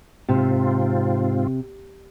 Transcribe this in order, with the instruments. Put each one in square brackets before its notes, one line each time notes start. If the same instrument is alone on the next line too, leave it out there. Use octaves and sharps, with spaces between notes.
[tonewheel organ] G#2 C4 F4 [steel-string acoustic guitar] C3